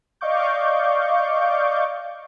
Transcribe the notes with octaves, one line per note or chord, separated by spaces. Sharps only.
D5 D#5 F5 C#6 D6 G6